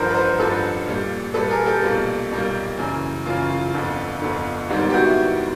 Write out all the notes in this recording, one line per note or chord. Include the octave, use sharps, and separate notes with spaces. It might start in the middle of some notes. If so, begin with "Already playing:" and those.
Already playing: A1 G2 D3 F3 A#4 C5
B4
A#4 C5
A1 G2 D3 F3 A4 B4
A#1 A#2 G3
A#1 A#2 G3 A4 B4
G#4 A#4
G4 A4
B1 A#2 G3 A#3
B1 A#2 G3 A#3
F#2 C#3 E3
F#2 C#3 E3 F4
F4
G1 F2 D3
G1 F2 D3
G#1 G#2 D#3 G3 B3
G4
E4 F#4